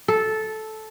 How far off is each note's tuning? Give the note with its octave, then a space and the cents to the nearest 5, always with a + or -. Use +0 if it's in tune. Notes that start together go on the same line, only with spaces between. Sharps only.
A4 -10